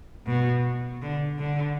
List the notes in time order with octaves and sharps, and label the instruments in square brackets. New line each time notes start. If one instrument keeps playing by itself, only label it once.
[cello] B2
D3
D3